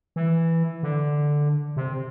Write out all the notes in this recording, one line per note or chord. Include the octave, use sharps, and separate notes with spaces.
E3
D3
C3